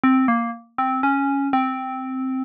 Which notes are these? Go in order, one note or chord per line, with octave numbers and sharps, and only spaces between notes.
C4
A#3
C4
C#4
C4